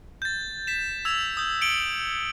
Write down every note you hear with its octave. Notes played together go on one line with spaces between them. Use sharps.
G6 A6
B6 E7
E6 G#6 F7
D#6 G6
C#7 D7 F#7 G7